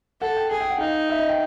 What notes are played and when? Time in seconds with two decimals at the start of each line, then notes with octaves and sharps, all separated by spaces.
0.21 A4 F#5
0.36 G5
0.51 G#4 G#5
0.61 G5
0.70 F#5
0.80 D#4 F5
1.10 E5
1.19 D#5
1.29 G5